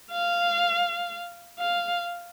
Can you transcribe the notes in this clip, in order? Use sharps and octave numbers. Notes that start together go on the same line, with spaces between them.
F5
F5